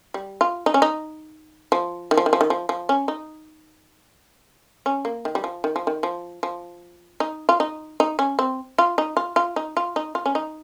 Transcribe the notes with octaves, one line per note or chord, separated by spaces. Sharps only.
G3
F4
D#4
C#4
D#4
F3
D#3
F3
D#3
F3
D#3
F3
F3
C#4
D#4
C#4
A#3
D#3
G3
F3
D#3
F3
D#3
F3
F3
D#4
F4
D#4
D#4
C#4
C4
F4
D#4
F4
F4
D#4
F4
D#4
F4
C#4
D#4